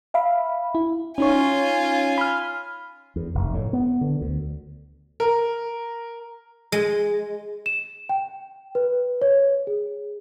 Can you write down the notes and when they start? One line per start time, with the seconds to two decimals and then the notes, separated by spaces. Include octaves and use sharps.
0.14 E5 F5 B5
0.75 E4
1.18 C#4 D#4 F4 C#5 G#5
2.18 B5 F6
3.16 E2
3.35 F1
3.54 A2
3.73 B3
4.01 D3
4.21 D2
5.20 A#4
6.72 G#3
7.66 E7
8.09 G5
8.75 B4
9.22 C#5
9.67 G#4